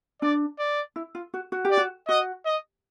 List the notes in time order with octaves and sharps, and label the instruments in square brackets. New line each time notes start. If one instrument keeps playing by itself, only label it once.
[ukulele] D4 [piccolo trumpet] D5
[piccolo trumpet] D5
[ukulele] E4
F4
F#4
F#4
G4
[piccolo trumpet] D5
[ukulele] F#4
[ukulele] F#4 [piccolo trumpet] D#5
[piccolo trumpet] D#5